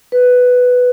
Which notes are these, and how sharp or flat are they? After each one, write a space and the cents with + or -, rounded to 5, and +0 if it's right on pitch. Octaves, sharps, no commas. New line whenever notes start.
B4 +5